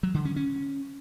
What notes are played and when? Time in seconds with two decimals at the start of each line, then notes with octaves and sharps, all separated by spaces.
0.03 F#3
0.14 D3
0.25 C#4
0.36 C#4